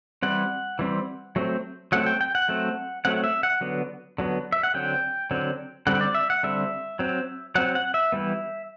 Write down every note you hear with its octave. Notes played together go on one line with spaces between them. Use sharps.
E3 G3 C4 F#5
E3 G3 C4
F#3 A3 C4
F#3 A3 C4 F#5
G5
G5
F#5
F#3 A3 C4
F#3 A3 C4 F#5
E5
F#5
D3 F#3 B3
D3 F#3 B3
E5
F#5
D3 F#3 C4 G5
D3 F#3 C4
D3 G3 C4 F#5
D5
E5
F#5
D3 G3 C4 E5
F#3 C4
F#3 C4 F#5
F#5
E5
E3 G3 B3